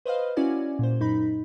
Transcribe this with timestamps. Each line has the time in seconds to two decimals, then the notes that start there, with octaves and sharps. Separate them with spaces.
0.06 B4 C5 D#5 F5
0.37 C#4 E4 F#4 D5 G#5
0.79 A#2 C5
1.00 F#2 D#4 B5